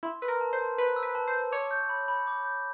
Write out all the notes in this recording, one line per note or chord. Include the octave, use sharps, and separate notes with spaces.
E4 C6
B4 E6
A#4
A5
C5
A5
B4 C6
E6
B4
A5
C5
A5
C#5 D6
G6
B5
B5
D6
G6